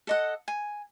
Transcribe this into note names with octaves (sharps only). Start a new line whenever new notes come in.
A4 D#5 F#5
G#5